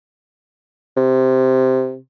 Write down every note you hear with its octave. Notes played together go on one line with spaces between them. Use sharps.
C3